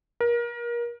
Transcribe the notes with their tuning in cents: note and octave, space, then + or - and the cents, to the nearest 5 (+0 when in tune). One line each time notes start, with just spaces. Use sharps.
A#4 +30